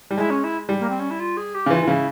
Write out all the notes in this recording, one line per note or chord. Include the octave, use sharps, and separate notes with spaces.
G3
G#3 E4
C#4
E4
G3
A#3
C4
C#4
E4
F4
G#4
G4
C#3
E3 F4
E3
C#3 E4